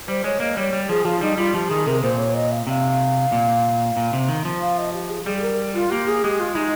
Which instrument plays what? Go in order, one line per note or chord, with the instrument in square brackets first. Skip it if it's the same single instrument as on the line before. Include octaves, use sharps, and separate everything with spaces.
[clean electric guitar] G3 [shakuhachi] C5
[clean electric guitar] G#3 [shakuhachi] C#5
[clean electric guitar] A#3 [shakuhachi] D#5
[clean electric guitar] G3 [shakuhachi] C#5
[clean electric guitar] G3
[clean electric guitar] F3 [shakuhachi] G#4
[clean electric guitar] F3 [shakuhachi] F4
[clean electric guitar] G3 [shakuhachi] D#4
[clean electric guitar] G3 [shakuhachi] F4
[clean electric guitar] F3 [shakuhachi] G4
[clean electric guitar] D#3 [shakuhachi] G#4
[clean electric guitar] C3 [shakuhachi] A#4
[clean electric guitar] A#2 [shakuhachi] C5
[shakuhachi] C#5
D#5
F5
[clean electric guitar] C3 [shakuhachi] F5
[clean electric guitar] A#2
A#2
C3
D#3
F3
[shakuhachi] F5
D#5
G4
G#4
[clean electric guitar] G3 [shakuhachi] G#4
[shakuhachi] G#4
A#4
F4
[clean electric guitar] A#3 [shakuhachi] G4
[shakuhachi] G#4
[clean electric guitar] G#3 [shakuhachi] G4
[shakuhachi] F4
[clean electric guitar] G#3 [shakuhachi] D#4